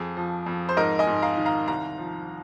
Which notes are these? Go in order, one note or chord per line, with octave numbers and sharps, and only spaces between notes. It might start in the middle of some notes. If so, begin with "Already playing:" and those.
Already playing: F2 G#4
F3
F2
C5
G#2 A#4 D#5
D#5 G#5
G#2
F5 A#5
D#3
F5 A#5
C2 F5 A#5
F3